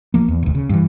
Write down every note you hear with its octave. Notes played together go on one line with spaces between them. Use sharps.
A#1 F3 A#3
E2
E1 D2
C#3
G2 E3